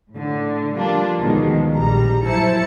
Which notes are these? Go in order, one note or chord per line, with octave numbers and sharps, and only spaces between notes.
A2 D3
F3 G3 A#3 D4 F4
D2 B2 D#3 F3 G#3
A#1 G3 A#5
F3 F#3 E4 C5 A5 C#7